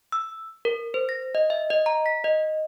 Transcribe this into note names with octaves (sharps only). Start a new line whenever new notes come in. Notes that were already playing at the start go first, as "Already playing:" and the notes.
E6
A#4
C5
A#6
D#5
E5
D#5
A#5
B6
D#5